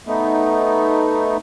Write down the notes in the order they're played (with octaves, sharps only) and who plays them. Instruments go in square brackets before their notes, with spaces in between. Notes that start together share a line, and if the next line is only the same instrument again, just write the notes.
[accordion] A3 B3 D#4